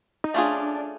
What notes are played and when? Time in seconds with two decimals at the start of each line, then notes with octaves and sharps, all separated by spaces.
0.24 D#4
0.34 A3 C#4 D4 F4 G#4